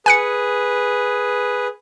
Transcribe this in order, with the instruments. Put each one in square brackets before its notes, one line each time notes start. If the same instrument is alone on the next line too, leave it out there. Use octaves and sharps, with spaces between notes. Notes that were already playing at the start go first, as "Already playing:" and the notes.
[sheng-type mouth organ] G#4 B4 [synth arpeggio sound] G#5 F#6 C#7